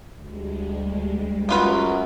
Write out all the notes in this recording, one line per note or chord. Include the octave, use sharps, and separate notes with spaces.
D2 G3 G#3
F#2 B3 F4 B4